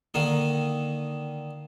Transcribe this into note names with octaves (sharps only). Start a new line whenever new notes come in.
D3 D#3 A#3